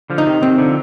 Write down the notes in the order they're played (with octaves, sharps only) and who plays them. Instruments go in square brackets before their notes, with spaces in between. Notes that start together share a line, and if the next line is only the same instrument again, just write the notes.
[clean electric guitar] D3 F3
[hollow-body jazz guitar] D#4
[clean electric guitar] C3 D#3
[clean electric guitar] C3 D#3 [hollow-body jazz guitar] C4
[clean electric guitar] D3 F3